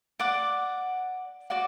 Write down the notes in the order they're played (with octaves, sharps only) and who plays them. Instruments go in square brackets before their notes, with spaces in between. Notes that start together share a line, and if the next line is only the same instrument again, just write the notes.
[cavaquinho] D5 F#5 D6
F#4 D5 F#5 D6